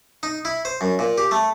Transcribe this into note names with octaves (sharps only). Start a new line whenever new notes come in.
D#4
E4
C5
F#2
A#2
G4
A3